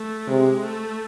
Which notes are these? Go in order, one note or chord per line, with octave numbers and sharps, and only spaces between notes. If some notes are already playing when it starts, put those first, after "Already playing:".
Already playing: A3
C3 G#3
A3